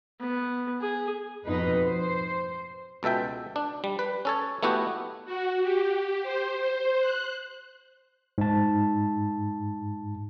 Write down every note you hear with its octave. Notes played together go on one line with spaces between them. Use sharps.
B3
G#4
F2 B2 D#4 B4
C5
C#2 B2 A4 E5 G5
D4
G3
B4
C#4 A4 C#5
A3 B3 E4 F#4 G4
F#4
G4
C5
C5
F#6
G#2 A5